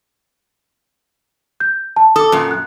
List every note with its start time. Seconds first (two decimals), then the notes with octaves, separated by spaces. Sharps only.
1.60 G6
1.96 A5
2.16 A4 D6 D#6
2.32 F#2 A#2
2.51 F#6